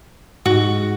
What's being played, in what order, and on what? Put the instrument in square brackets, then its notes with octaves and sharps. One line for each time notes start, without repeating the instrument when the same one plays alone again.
[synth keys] G#2 [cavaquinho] F#4